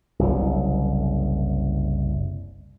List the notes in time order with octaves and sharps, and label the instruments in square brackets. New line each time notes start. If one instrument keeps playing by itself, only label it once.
[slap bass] F#1 C2